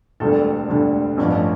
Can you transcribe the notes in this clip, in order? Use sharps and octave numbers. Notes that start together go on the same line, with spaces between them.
E1 D2 D3 G3 A4
E1 D2 D3 G3
A1 G2 F3 C#4